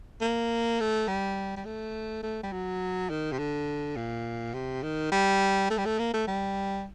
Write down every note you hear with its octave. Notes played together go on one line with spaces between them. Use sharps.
A#3
A3
G3
G3
A3
A3
G3
F#3
D#3
C3
D3
A#2
C3
D#3
G3
A3
G3
A3
A#3
A3
G3